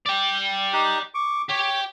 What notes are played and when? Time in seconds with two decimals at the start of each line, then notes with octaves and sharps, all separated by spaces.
0.06 D5 G5
0.73 D#4 G4 F#6
1.14 C#6 D6
1.49 G4 C#5